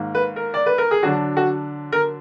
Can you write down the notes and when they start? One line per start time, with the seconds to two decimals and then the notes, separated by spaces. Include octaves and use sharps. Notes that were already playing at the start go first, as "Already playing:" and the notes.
Already playing: G#2 D#3 A#3
0.15 B4
0.36 A#4
0.54 D5
0.66 B4
0.78 A#4
0.91 G#4
1.03 D3 F#3 D4 F#4
1.37 F#4
1.92 A#4